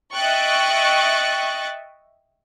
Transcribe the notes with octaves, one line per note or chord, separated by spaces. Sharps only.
D#5 E5 G5 C#6 F#6 A6